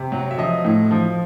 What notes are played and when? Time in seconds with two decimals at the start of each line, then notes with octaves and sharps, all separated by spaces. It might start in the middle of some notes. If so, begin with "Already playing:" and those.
Already playing: C3
0.12 F#3
0.31 E5
0.38 F3 D#5
0.64 A2
0.91 F3